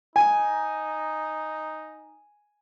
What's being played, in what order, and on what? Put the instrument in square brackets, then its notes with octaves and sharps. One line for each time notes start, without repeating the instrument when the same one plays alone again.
[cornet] D#4 [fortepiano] G#5